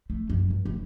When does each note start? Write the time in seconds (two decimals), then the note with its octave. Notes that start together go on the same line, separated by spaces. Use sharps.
0.10 A3
0.30 F#2
0.50 G2
0.65 F1